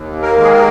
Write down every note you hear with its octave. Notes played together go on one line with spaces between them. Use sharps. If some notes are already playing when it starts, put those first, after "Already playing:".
Already playing: D#2
A#3 A#4
D#3 G#3
G#4
A#3 A#4